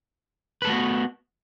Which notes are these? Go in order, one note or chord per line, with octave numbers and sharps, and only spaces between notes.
A3 B3 F#4 A4 B4